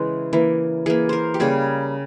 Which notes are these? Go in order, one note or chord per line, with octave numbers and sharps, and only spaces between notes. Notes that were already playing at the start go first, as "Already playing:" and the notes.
Already playing: C#3 E3 G#3
E3 A#3
E3 A#3 G#4
A#4 C5
G4
C#3 G3 A#3 G#4